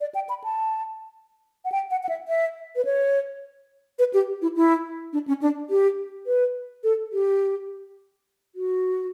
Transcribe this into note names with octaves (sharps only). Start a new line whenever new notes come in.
D5
G5
B5
A5
F#5
G5
F#5
F#5
E5
E5
B4
C#5
B4
G4
E4
E4
D4
C#4
D4
G4
B4
A4
G4
F#4